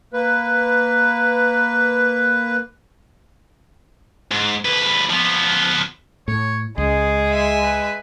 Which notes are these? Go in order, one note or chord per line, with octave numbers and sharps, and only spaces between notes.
A#3 B4
G#2
D2 B4
F3 B3
A2 C#5
C#2 G#3 G#4
E5 G#5
B4